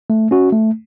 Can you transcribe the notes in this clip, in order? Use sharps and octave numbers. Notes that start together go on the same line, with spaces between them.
A3
C#4 F#4
A3